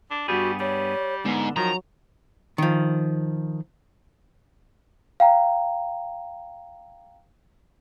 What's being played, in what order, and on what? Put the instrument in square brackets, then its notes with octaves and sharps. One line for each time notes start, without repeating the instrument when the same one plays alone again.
[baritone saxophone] D4
[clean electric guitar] G2 B3 G#4 [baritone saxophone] G3 [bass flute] F#4
[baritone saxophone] G3 [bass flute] C#5
[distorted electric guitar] G#2 [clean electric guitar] D3 [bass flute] B3
[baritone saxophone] D#3 [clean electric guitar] F3 [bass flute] F#3 [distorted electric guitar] A#5
[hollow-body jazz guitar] D#3 F3
[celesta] F5 G5 A#5